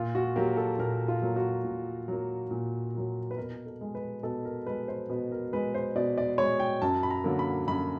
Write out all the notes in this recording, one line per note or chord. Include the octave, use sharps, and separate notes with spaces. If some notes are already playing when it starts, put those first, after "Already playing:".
Already playing: A#2 F4
F#4
F#3 A#3 G4
A4
A#2 A#4
F4
F#3 A#3
F#4
A#2
F#3 A#3
A#2
F#3 A#3
B4
B2 A#4
A4
G#3
B4
B2 A4
A#4
G#3 B4
C5
B2 B4
A#4
G#3 B4
C5
B2 D5
D5
G#3 C#5
G5
F#2 A5
B5
A#5
D3 F#3 A#3
B5
F#2 B5